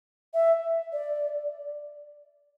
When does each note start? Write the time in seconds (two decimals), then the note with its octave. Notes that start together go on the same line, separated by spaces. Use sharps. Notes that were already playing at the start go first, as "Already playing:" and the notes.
0.34 E5
0.92 D5